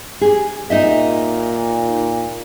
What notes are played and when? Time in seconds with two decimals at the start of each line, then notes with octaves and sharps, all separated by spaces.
0.21 G4 G#4
0.70 A#2 D#4 D#5 E5